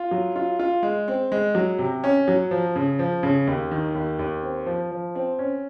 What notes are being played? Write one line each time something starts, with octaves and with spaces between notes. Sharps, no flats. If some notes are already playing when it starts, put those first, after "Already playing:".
Already playing: F4
F#3
F4
F4
G#3
C4
G#3
F#3
C3
C#4
F#3
F3
C#3
F3
C#3
D#2
D#3
D#2
D#2
C4
F3
F3
C4
C#4